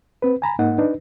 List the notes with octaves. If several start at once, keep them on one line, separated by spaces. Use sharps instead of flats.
C4 B4
G#5 A#5 B5
G#2 A#3 D#4 F#5
D4 D#4 B4